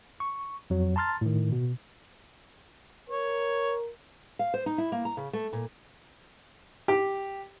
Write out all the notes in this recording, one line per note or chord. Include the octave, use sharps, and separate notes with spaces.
C#6
F2 F#3
A5 A#5 C6 F6 A6
A2 D#3
B2
A#4 C#5
F5
C5
D#4
E4
A#3
A#5
C#3
A3
A#2
G4